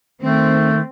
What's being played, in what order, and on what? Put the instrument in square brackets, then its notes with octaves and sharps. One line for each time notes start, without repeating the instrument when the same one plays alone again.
[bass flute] D#3 [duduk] A3 [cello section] C4